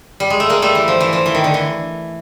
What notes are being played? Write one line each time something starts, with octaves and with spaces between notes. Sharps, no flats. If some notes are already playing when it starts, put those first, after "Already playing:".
G3
G#3
A3
G#3 A#3
G3 A3
E3
F3
E3
F3
E3
D#3
D3
E3